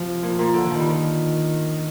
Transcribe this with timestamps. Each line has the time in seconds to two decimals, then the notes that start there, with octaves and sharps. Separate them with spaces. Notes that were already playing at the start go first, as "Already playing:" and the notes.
Already playing: C3 F3
0.23 A#2
0.39 A#2
0.54 D3
0.70 D#3 F3
0.80 G3
0.90 F3